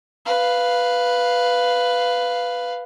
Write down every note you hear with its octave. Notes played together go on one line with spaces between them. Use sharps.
B4 F5